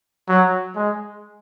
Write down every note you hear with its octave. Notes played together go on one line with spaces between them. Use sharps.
F#3
G#3